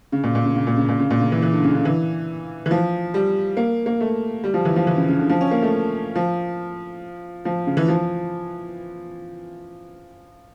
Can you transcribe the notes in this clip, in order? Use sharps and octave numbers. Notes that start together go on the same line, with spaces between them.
C#3
A#2
A#2
C#3
C#3
A#2
C#3
A#2
C#3
A#2
C#3
E3
E3
D3
C#3
D3
E3
E3
F3
G3
A#3
A#3
A3
G3
F3
E3
F3
E3
C#3
C#3
D3
F3
C#4
A#3
A3
F3
F3
C#3
E3
F3